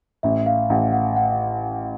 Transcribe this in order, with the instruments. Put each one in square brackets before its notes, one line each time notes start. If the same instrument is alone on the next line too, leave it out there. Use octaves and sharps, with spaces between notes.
[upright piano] A1 [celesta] E5
[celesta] F5
[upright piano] A1 [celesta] F#5
[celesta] F#5
F#5